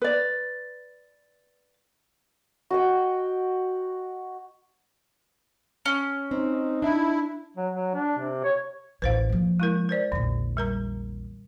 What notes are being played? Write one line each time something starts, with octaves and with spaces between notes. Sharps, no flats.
B4 D5
F#4 D#5 G5
C#4
C4 D#4
D4 E4 E5
F#3
F#3
D4
C3
C#5
A1 D2 B4 C5 F5
F3 A#3
G#3 E4 A#4
A#4 C5 D5
A#1 E2 D3
G3 A#4 A#5